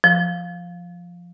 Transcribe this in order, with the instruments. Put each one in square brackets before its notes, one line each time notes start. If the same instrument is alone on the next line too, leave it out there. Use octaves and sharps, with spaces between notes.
[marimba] F3